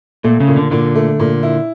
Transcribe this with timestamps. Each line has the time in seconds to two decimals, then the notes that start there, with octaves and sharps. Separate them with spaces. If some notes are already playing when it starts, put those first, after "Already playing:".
0.24 A#2 A3
0.40 C#3
0.48 A#2
0.56 D3
0.71 A#2 D3
0.95 A3
1.20 A#2
1.43 E4